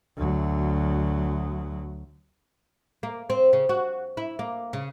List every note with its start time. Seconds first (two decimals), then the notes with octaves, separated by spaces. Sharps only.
0.17 D2 F#3
3.03 A#3
3.30 C4
3.53 C#3
3.69 F#4
4.17 E4
4.39 A#3
4.73 C#3